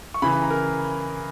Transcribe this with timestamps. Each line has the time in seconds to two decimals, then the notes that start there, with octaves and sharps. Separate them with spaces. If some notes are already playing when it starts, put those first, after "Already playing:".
0.14 C#6
0.22 C#3 E3 B5
0.32 B5
0.42 A#5
0.50 A#4